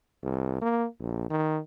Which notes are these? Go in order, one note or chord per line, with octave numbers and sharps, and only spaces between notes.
C2
A#3
A#1
D#3